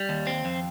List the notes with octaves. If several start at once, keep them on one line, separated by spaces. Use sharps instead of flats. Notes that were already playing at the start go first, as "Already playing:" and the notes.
Already playing: G3
D#2
C4
F2